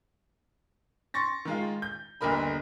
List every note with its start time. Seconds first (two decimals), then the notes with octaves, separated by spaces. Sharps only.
1.14 C6 C#6 A6 A#6
1.45 D#3 G#3 F4
1.82 G6
2.21 G1 D#2 D3 A#4 D#5 B5